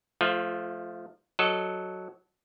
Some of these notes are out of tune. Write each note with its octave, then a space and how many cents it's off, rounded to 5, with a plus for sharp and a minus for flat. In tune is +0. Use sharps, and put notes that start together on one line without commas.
F3 -5 A3 -20 F4 +25
F#3 +0 A4 +0 D#5 +0